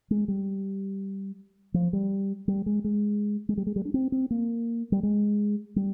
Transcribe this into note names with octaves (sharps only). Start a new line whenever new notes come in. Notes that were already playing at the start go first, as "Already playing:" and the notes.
G#3
G3
F3
G3
G3
G#3
G#3
G#3
G3
G#3
G3
D4
C4
C4
A#3
G3
G#3
G3